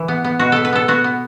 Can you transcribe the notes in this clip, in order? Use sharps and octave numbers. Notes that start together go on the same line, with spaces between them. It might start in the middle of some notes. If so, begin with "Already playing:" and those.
Already playing: E3
B3
B3
B2 F#4
B3 A4
B4
B3 A4
B3 F#4
B3